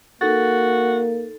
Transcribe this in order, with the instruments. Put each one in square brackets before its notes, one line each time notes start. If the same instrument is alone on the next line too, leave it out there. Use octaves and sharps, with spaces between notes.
[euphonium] A#3 [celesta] D#4 A4 A6 [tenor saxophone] F#4